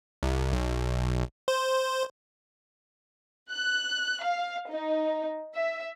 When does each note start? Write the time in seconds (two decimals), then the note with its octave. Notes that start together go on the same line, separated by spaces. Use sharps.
0.23 C2
0.53 B1
1.48 C5
3.50 F#6
4.22 F5
4.69 D#4
5.55 E5